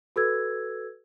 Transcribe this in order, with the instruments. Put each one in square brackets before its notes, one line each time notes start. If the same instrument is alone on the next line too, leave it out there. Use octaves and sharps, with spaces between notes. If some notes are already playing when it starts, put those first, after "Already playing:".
[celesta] F#4 A4 B4 E6 G#6